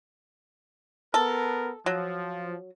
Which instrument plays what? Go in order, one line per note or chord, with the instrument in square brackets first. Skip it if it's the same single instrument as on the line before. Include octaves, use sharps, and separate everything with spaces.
[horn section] B3 A#4 [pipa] A4
[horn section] F3 [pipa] F#3